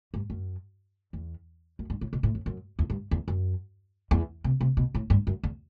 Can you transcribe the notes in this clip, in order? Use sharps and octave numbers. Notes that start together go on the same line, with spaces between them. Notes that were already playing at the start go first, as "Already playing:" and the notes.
G2
F#2
E2
F#2
G2
A2
B2
A2
F#2
F#2
E2
G2
E2
F#2
E2
C3
C3
B2
A2
G2
F#2
E2